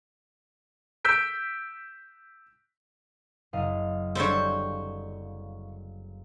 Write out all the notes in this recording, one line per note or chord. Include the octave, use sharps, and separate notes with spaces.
E6 G6 B6 D7
F#1 D#5 F5
D3 G3 C4 C5 C#5